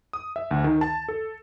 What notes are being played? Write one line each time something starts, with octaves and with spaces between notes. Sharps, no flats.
D#6
E5
D2
D#3
A5
A4